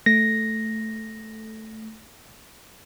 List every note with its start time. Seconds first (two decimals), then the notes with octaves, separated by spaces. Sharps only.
0.06 A3 A#6